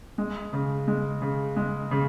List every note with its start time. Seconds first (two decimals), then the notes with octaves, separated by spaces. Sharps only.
0.18 G#3
0.53 C#3
0.88 G#3
1.22 C#3
1.56 G#3
1.91 C#3